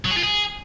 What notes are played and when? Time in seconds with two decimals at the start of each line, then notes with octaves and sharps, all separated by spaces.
0.05 F#3
0.11 G#4
0.17 F4
0.23 G#4